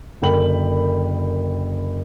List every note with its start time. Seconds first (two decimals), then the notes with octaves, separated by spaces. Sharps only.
0.22 F#1 D3 A#4 G5 B5 F#7